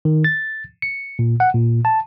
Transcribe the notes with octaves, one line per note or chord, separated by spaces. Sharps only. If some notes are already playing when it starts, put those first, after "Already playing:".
D#3
A6
C#7
A#2
F#5
A#2
A5